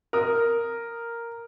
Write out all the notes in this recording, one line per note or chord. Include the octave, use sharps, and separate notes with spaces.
A#4 D#6